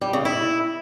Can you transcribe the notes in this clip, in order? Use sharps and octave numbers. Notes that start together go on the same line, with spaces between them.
G3
C#3
E4